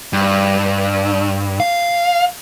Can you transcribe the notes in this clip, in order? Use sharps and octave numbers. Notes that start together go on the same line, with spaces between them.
G2
F5